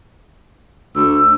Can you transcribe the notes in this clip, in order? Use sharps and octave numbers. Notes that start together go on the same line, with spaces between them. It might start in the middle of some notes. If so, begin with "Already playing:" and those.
D2 E6